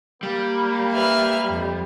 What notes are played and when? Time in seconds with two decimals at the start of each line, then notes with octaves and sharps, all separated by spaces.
0.23 G3 A#3
0.92 B4 E5 F6
1.48 F2